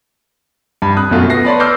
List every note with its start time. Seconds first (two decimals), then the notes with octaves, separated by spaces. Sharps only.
0.82 G2 B5
0.96 F2 D#6 F#6
1.11 F#2 B2 A3 F4 F#4 E5
1.30 B3 A#6 C7
1.45 B4 C#5 D5 A5 B5 C6
1.60 D6 E6 F6 G6 A#6 C7